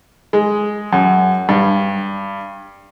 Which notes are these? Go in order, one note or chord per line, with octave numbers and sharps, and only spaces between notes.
G#3
F#2
G2